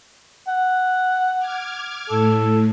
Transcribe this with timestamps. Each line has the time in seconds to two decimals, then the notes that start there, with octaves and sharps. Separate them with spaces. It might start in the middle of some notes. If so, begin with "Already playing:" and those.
0.48 F#5
1.39 D6 F6 G#6
2.10 A2 A4